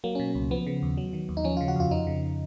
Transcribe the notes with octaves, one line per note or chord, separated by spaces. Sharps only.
F#3 A#3
B2 C#4
C#2
F3 B3
C#3
D#2
F#3
D#3
D#2
D#4
F3 C#4
C#3 F4
F#4
F2 F4
F3 D#4
C#3